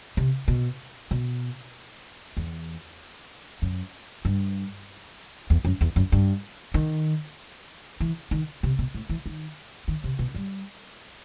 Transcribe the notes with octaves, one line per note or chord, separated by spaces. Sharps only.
C3
B2
B2
E2
F#2
G2
E2
F#2
E2
F#2
G2
D#3
E3
D#3
C3
B2
A2
E3
D#3
D#3
C3
B2
G3